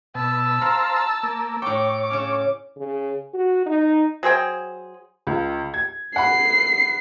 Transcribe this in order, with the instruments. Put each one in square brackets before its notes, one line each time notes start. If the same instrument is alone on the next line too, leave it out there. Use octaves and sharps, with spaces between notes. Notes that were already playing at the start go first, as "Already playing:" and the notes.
[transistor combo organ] B2 [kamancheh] A5 E6
[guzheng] A#4 F#5 [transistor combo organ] C5 F5 A#5
[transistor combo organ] A#3
[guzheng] A2 G5 [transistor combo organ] C#5 [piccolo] D6
[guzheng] C#3 C#4
[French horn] C#3
F#4
D#4
[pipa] F#3 G#4 C5 G5
[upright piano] C#2
G#6
[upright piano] F#5 B5 [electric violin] C7